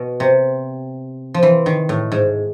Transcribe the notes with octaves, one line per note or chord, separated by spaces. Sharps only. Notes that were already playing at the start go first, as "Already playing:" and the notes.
Already playing: B2
C3
F3
E3
D#3
A2
G#2